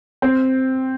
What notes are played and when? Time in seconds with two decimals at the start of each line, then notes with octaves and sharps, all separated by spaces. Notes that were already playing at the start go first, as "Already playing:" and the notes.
0.22 C4